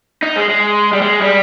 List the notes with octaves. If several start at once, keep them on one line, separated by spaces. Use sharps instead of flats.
D#4
G#3
G#3
G3
G#3
G3